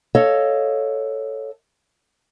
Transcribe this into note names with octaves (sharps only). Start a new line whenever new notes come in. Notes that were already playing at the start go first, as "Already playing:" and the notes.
A4 C#5 D#5 F5